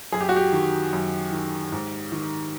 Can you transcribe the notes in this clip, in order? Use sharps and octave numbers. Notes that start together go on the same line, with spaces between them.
F#2 G#4
G4
F#4
G4
D#3
F#2
D#3
G#2
D#3